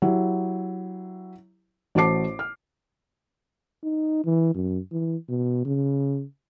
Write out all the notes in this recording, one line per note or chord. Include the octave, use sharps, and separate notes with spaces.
F#3 E4 G4
A1 F#4 C5 A5 D6 C7
F6
D#4
E3
F#2
E3
B2
C#3